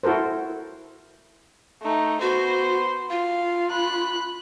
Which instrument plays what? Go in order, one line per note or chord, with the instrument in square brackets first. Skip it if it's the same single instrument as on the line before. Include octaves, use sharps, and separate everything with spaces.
[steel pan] E4 F#4 A4 A#4 C5
[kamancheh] A3 D#4
[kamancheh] B3 C5 [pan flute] F#4
[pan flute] F4 [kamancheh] F5
[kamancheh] B5 F#6